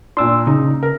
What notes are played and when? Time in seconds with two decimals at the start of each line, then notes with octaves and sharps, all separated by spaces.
0.17 A#2 D4 C6 E6
0.47 C#3 D#4
0.83 A#4